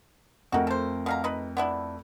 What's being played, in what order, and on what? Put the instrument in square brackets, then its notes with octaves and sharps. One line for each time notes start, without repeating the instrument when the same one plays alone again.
[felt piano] F2 A3 A#4 [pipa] D#4 F#4
[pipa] A4 C5
B2 F5 A#5
D#4 B4
B3 D4 E4